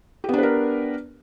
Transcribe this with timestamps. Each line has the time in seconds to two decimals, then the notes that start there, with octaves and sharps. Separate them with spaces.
0.24 G4
0.29 B3
0.33 D4
0.38 B4
0.43 A#4